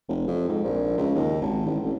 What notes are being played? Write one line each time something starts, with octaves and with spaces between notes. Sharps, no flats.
F1
F2
G#2
A#1
C#2
D#2
G#1
A1
A1